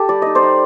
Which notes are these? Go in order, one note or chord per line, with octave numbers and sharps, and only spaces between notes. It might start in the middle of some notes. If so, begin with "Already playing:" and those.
Already playing: G4 A4
G3 D5
D#4 D#5
C5 D5
D#4